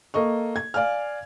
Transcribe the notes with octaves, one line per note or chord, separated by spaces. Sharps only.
A#3 A4 D#5 C#6
G#6
D5 F5 G#5 F6